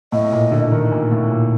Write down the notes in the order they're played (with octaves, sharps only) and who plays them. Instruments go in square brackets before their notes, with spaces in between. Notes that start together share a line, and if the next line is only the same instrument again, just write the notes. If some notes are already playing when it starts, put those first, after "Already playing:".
[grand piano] A2 [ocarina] D#5
[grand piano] A#2
D3
D#3
A#2
A2
A#2